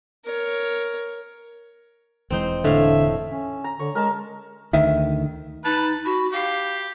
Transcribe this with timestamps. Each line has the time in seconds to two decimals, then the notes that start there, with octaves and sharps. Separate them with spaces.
0.25 A#4 C#5
2.30 E1 E3 G#3 C4 D#4 C5
2.64 A2 D3 E5 F5
3.30 C#4
3.64 A#5
3.79 D3 C#5
3.95 G#3 A#4 A5
4.73 D2 D#3 E5
5.65 D#4 B4 A5
6.05 F#4 B5
6.32 G4 F5